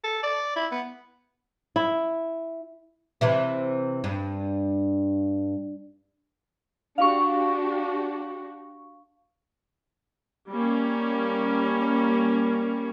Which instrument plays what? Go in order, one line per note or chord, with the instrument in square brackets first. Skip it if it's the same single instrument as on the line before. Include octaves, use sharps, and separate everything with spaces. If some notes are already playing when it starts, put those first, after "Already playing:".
[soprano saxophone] A4
D5
E4
B3
[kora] E4
[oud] C3 E3 E4
G2
[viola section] D4 F#4 G4 [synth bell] F5 C#6
[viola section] G3 A#3 C#4